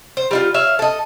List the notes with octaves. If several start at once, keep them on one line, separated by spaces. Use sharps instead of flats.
C5
G3 D#4 F4
C#5 E5 F5
A4 D#5